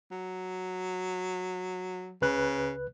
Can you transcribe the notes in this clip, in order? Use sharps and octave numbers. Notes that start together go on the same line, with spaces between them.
F#3
C#2 C#3 B4 F#6